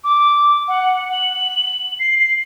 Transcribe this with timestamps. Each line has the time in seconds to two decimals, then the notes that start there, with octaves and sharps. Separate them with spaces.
0.04 D6
0.68 F#5
1.12 F#7
2.00 C7